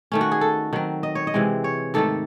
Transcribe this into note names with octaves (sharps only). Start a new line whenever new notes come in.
D#3 A3 C#4
F#4
G#4
A4
D#3 F#3 C4
D#5
C#5
D#5
C3 E3 G#3 C4
C#5
G#2 D#3 A3 A4